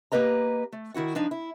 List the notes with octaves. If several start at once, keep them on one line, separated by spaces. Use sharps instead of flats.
A#3 G4 B4 D#5 A#5
A3
D#3 E4 F#4 F#5
F3 D4 D#4
E4